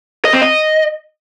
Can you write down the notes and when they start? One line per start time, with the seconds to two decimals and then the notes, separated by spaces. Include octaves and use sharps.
0.25 D#5
0.33 C4
0.42 D#5